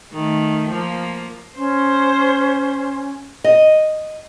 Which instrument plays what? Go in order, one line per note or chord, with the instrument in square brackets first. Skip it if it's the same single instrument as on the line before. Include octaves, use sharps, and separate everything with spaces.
[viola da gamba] D#3 A3
F3 A#3
[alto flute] C#4 [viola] C5
[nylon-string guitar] D#5